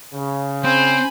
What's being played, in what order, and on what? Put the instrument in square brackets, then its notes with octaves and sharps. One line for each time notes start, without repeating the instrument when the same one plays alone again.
[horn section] C#3
[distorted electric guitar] C4 [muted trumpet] C5 [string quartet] G#5 B5